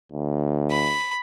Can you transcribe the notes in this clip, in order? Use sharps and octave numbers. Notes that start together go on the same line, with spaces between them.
D2
B5